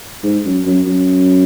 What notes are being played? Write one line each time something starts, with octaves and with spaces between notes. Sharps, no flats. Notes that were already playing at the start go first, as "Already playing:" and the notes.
G#2
F#2
F#2
F#2